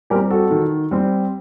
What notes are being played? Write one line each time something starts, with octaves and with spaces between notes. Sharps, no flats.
G3 C4 G4 A#4
F#4 A4
D#3
G3 C4